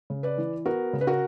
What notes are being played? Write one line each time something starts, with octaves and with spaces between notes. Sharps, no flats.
C#3
B4 D5
E3
B3 F#4 A#4
C#3
B4
F#4 A#4